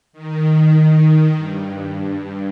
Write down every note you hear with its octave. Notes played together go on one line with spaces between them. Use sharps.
D#3
G2